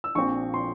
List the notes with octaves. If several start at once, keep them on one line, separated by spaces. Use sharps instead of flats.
E6
A#1 A#2 F3 C4 C#6
C6